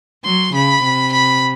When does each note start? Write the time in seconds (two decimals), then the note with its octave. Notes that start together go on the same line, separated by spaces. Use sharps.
0.24 F#3 C6
0.54 C#3 B5
0.83 C3
1.13 B5